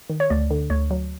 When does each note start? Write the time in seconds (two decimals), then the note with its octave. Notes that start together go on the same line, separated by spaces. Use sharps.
0.10 D#3
0.20 C#5
0.30 D2 D5
0.51 D3
0.70 D2 C#5
0.91 F#3